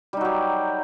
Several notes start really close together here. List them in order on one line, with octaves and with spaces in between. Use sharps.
G3 D#4 F#3 G4